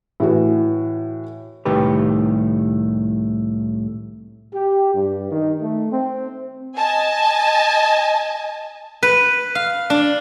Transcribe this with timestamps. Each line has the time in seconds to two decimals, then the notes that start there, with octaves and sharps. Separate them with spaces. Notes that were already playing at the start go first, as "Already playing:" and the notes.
0.20 A2 E3 F#4
1.65 C2 A2 D#3 G4 B4
4.53 G4
4.93 G2
5.30 D#3
5.62 A3
5.91 C4
6.78 D#5 G#5 A5
9.03 B4
9.55 F5
9.90 D4